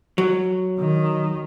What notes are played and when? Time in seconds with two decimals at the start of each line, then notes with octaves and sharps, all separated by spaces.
0.18 F#3
0.79 D#3